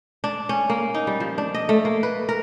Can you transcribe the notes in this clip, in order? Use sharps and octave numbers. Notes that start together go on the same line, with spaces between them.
D4
C#4
A#3
D#4
G3
F3
D4
D#5
A3
A#3
B4
A#4